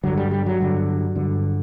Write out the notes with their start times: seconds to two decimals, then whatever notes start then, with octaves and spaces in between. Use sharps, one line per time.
0.04 G2 D3 F#3
0.18 G3
0.31 G3
0.46 F#3
0.60 G2 D3
1.16 G2 D3